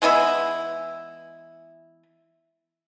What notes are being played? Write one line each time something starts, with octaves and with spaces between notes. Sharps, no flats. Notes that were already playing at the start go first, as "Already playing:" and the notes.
E3 G#3 B3 E4